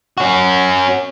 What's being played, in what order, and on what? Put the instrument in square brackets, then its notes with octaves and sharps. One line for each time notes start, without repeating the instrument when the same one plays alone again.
[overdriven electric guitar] C#4 F#4